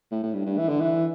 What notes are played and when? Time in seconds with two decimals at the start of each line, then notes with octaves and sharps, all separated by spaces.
0.11 A2
0.23 A2
0.34 G2
0.45 G2
0.58 E3
0.69 D3
0.81 E3